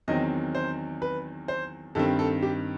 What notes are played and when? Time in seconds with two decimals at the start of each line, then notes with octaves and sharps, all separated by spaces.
0.08 E2 D#3 F#3 C4 D#5
0.55 C5
1.02 B4
1.48 C5
1.95 G2 D#3 G3 C4 A4
2.19 A4
2.42 G4